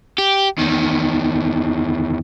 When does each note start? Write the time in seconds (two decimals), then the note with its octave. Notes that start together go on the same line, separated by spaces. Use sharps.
0.19 G4
0.58 E2 D#3